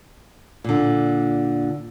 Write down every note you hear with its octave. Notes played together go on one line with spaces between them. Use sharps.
A#2 D3